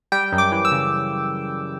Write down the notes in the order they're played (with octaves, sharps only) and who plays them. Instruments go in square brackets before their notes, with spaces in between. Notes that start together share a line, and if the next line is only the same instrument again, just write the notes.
[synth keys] G3 G5
F#2
D6
E3
E6
C#3